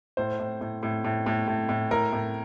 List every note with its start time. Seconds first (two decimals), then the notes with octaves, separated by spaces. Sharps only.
0.17 A2 C5
0.39 A2
0.61 A2
0.83 A2
1.04 A2
1.26 A2
1.48 A2
1.69 A2
1.91 A2 A#4
2.13 A2